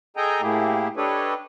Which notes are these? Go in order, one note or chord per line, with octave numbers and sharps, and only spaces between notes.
G#4 A4 D#5 G5 G#5 A#5
A2 A3 A#3 E4 G4 G#4
D4 G4 A4 B4 C#5 D#5